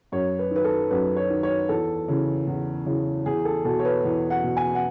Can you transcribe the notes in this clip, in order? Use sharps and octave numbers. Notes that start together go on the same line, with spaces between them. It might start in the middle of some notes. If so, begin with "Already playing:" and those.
F#2 C#5
B4
D#3 B4
A4
F#2 B4
C#5
D#3
C#5
E2 A4
C#3 E3
E2
C#3 E3
E2 G#4
A4
B2 A4
C#5
B4
E2
F#5
B2
G#5
F#5